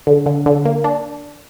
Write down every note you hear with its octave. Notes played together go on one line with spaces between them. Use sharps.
D3
D3
D3
A#3
D4